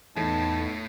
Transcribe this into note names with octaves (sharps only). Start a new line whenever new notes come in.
E2 A2 A3 B3 D#4 A5